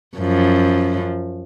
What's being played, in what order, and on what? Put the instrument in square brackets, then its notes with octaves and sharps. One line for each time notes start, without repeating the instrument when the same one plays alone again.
[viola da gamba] F#2 F3